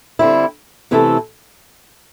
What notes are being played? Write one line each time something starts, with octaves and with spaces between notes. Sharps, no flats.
D3 G3 C4 E4
C3 E3 A3 E4 A4